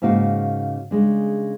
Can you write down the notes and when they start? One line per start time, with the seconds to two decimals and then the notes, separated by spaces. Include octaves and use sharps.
0.02 G#2 C#3 A#3 F#4 F5
0.91 C#3 G#3 D4